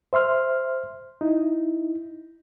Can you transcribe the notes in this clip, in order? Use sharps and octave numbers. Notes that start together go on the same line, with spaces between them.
C5 E5 C6 F6
D#4 E4